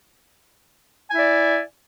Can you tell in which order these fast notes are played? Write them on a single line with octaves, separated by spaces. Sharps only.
G#5 E4 E5 D5